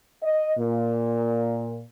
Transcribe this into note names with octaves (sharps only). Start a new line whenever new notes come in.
D#5
A#2